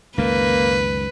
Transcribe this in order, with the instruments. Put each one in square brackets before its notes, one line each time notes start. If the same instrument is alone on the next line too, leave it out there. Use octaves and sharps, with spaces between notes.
[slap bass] C#2 F#2 D#3 [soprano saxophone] A#3 [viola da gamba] B4